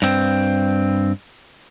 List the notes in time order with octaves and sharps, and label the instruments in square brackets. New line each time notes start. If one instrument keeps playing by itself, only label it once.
[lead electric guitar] G2 C4